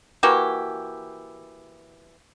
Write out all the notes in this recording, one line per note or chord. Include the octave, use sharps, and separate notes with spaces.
E3 A#3 F#4 G4